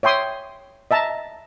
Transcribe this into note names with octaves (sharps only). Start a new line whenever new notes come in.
C#5 E5 G5 C6 D#6
D#5 E5 A5 A#5